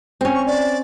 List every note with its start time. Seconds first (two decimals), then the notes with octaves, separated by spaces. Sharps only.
0.21 C4 C#4
0.35 C#6
0.47 D5